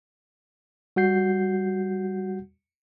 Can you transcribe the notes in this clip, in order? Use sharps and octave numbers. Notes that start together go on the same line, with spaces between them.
G3 F#4 F#5 G6 C7